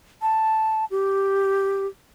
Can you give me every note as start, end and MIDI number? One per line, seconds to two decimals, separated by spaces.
0.22 0.85 81
0.91 1.87 67